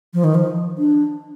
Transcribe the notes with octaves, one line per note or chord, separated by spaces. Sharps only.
F3
D#3
F3
D4